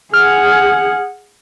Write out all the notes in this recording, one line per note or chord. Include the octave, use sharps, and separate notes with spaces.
G#4 F#5 F6